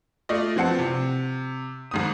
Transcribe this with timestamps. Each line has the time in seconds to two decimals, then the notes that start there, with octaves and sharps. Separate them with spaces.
0.29 A3 F4 D5 D#5
0.56 E3 F3 C4 F#5 A5 C#7
0.78 C3
1.91 G#1 G#2 D#6